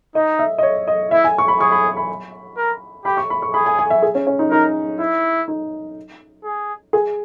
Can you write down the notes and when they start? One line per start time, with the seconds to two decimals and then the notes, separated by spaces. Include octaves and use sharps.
0.15 D#4 D#5
0.39 E5
0.58 D#5
0.63 C#5
0.88 D#5
1.11 E4 E5
1.24 G#5
1.38 C#6
1.48 B5
1.60 G#4 C#6
1.72 B5
1.97 B5
2.57 A#4
3.05 G4 B5
3.17 C#6
3.30 B5
3.42 C#6
3.54 G#4 B5
3.66 G#5
3.79 G#5
3.90 E5
4.02 G#4
4.15 C#4
4.27 C#4
4.39 D#4
4.51 D#4 A#4
5.00 E4
5.48 D#4
6.44 G#4
6.93 G#4